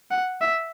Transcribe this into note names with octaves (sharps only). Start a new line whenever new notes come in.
F#5
E5